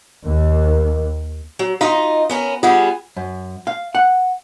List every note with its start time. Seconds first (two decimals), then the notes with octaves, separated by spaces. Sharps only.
0.23 D#2
1.59 F#3
1.81 D#4 F4 F#4 D#5 F5 A#5
2.30 B3 C#4 A#4
2.63 G3 B3 F4 G#4 F#5
3.17 F#2
3.67 F5
3.95 F#5